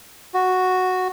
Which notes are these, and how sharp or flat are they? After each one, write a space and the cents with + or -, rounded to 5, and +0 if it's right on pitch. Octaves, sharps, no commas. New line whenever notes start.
F#4 -5